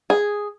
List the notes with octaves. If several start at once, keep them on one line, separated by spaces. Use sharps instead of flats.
G#4